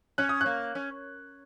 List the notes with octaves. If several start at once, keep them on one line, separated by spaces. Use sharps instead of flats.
C#4 F#6
D#6
F#6
A#3
C#4